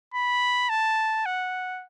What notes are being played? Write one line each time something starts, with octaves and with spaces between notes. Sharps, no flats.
B5
A5
F#5